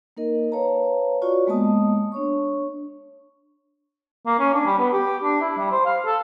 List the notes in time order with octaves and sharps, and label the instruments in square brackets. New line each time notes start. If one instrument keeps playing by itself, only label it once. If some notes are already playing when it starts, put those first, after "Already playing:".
[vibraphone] A#3 D#4 A#4 D#5
B4 C#5 F5 A5 A#5
F4 F#4 C#5 D5 C#6
G#3 A#3 B3 D#5 A5 D#6
D4 C#5 C#6
[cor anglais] A#3
C#4
D4
G3
B3
G4
D4
E4
G3
C5
F5
A4